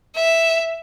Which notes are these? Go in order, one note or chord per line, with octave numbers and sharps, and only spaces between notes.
E5